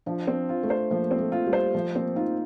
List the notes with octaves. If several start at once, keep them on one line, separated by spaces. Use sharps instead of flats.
F3 D4
C4
F4
A3
C5
F3 A#3
C4
A3
F4
G3
C5
F3 A3
A#3 C4
D#4 F4